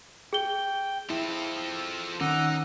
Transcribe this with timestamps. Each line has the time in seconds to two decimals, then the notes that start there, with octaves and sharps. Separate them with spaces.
0.33 G#4 G5 G7
1.10 F3 C4 E4 A4
2.21 D#3 C#4 D#4 F#5 D6 E6